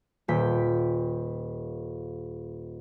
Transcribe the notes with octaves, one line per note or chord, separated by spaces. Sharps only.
D#1 G5 B6